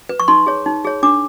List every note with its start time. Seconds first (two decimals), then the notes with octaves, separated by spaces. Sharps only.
0.09 B4
0.20 C#6
0.28 D#4 C6
0.46 G#4 C#5
0.66 D#4
0.84 G#4 C#5
1.03 D4 D6